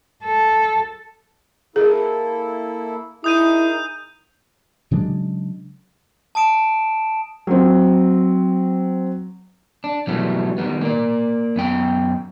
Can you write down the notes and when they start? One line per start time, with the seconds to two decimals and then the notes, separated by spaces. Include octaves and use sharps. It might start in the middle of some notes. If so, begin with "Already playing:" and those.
0.25 A4
1.76 A#3 E4 G#4 A4
3.24 D#4 E4 G#4 A#4 D#6 G6 D#7
4.91 C#3 F#3 G#3 D4
6.35 A5 D#6 D7 E7
7.47 F#3 C4
9.84 D4
10.07 B2 E3 F#3 G3 A3
10.58 D#3 G3 B3
10.81 A#3 D5
11.56 F#2 B3 G5